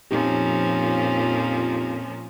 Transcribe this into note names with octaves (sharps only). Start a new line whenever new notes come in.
F2 A#2 F3 C#4 D#4 G4